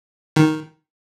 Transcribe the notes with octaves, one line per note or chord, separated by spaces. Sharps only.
D#3